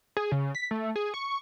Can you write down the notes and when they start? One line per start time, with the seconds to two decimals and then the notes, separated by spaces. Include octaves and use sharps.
0.17 G#4
0.32 C#3
0.55 B6
0.71 A3
0.96 G#4
1.14 C#6